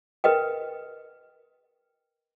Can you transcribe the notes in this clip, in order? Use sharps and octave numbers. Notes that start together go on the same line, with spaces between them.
A#4 B4 D#5 G5